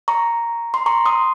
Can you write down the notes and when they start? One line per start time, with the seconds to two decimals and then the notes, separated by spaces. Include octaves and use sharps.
0.08 A#5 C#6
0.74 C6
0.86 A#5 C#6
1.05 C6 D#6